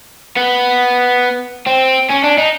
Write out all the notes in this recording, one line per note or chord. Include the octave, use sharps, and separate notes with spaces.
B3
C4
C#4
D4
D#4